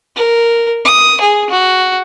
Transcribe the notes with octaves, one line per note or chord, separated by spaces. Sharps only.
A#4
D#6
G#4
F#4